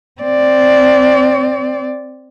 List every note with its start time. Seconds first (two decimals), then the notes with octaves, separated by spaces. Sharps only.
0.22 C4 D5